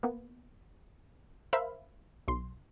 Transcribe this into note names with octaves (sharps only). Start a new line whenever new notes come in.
A#3 B3
A#4 C5 E5 F5 B5
B1 C6